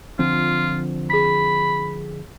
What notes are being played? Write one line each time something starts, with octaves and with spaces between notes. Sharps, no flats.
D3 F3 C4 F4
G#4 B5 B6